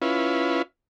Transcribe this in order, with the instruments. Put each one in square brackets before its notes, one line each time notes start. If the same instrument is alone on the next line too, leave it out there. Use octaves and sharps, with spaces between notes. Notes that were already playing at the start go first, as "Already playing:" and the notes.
[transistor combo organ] C#4 E4 F4 B4